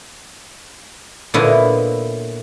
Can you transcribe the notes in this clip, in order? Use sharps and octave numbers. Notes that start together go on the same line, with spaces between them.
A#2 D3 B3 E4 C#5 D#5